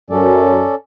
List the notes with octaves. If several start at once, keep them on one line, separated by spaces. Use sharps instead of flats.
F#2 C#4 A4 D5